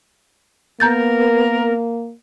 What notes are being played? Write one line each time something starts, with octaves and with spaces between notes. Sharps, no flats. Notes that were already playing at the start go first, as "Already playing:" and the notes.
A#3 B3 A#4 A#5 G6 A6